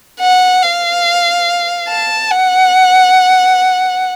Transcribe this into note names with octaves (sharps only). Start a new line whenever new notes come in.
F#5
F5
A5
F#5